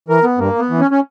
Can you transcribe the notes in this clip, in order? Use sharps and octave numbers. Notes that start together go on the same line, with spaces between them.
E3 A#4
B3
G2 A#3
B3
E3
C#4
C#4